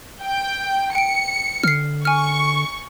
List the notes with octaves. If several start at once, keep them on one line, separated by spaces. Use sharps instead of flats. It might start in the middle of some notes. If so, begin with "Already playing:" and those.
G5
G5 C#7 D7
D3 F6 C7
G#5 C#6 F6